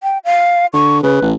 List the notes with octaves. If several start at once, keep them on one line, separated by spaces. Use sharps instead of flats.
G5
F5
D3 C#6
C#3 B4
A1